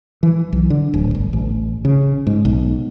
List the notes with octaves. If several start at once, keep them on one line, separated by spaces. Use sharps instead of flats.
E3
B1
D3
D1
G1
A1
C#3
G#2
B1